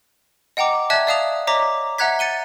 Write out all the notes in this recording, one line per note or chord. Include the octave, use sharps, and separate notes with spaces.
D#5 F#5 G5 A#5 D6
D5 E5 A5 F#6 G#6
D5 E5 F5 A5 D#6 F7
C#5 D#5 A#5 D6 B6
E5 F#5 A#5 F#6 G#6 B6
A6 C#7 D#7 G7